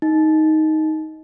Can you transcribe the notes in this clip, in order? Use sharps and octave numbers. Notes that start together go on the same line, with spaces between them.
D#4